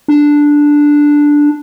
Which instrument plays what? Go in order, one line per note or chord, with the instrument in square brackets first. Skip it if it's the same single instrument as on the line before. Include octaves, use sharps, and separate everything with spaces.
[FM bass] D4